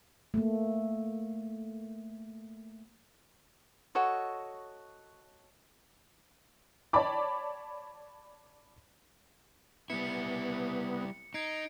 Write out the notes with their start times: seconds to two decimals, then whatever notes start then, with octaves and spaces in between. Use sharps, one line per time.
0.34 A3 A#3
3.95 F#4 A4 C#5 D#5
6.93 C#5 D5 G5 A5 B5 D6
9.90 G3 B3 E4 C#7
11.34 D#4 G#6 C7 D7